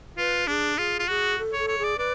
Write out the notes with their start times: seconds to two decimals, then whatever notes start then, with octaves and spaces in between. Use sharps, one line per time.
0.18 F4 B4
0.47 D4 G#4
0.77 F4 G#4
0.99 F4
1.08 F#4 G#4
1.39 A4
1.53 C#5
1.59 A4
1.68 C#5
1.79 G#4
1.84 D5
1.98 B4 D5